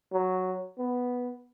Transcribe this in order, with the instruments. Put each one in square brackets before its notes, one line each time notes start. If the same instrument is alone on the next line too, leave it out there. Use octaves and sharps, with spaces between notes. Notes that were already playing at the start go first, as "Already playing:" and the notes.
[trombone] F#3
B3